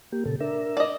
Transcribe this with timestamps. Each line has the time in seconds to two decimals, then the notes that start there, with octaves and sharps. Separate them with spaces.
0.12 A#3 G4
0.26 A#2 C#3 A4
0.40 D4 A#4 E5
0.77 D5 D#5